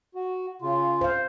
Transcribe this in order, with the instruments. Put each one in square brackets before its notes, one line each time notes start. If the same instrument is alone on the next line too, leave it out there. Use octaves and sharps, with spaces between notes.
[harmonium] F#4
C#3 F4
[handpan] C5 F5